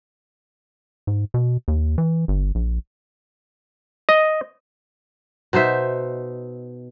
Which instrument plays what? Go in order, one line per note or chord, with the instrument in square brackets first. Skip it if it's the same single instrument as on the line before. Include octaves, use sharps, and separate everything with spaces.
[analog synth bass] G#2
B2
D#2
E3
G1
A#1
[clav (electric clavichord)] D#5
[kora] B2 D#4 C5 E5